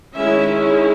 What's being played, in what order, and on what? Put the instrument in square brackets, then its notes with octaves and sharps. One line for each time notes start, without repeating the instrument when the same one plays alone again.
[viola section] D#3 G#3 C#4 E4 E5